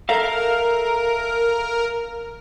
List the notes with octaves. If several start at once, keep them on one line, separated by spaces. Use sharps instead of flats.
A4 A#4 E5 F5